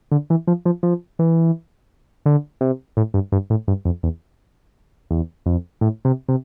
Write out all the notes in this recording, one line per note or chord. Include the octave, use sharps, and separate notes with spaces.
D3
E3
F3
F3
F3
E3
D3
C3
A2
G2
G2
A2
G2
F2
E2
E2
F2
A2
C3
C3